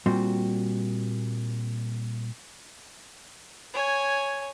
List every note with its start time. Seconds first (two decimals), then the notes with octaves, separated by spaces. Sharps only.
0.06 A#2 G3 C4 F#4 C6
3.74 C#5 G#5